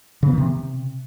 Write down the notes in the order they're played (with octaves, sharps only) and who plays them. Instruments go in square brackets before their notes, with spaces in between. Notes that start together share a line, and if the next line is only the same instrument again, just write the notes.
[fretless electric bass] C#3
B3
D#3
C3